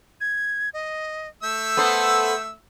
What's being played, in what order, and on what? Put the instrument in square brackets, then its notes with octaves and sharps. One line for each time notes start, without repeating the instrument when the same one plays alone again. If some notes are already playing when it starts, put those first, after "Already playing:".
[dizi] G#6
D#5
[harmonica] A3 E5 E6 [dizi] G6
[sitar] B3 A4 C5